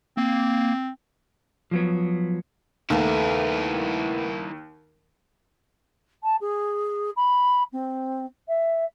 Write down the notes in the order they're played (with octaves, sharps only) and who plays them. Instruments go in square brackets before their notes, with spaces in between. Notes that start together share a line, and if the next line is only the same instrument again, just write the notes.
[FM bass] A#3 [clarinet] C4
[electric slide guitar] F3 F#3 B3
[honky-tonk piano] D#2 [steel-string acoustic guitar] A3 B3 [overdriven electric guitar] E4 A#4
[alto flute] A5
G#4
B5
C4
E5